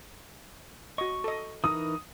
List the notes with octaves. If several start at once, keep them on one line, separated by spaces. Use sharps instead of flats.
F#4 D#5 C#6
A4 D#5
E3 D#4 A#4 D#6